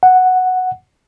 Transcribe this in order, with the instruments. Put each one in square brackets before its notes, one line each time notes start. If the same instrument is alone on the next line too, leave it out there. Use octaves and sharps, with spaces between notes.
[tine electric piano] F#5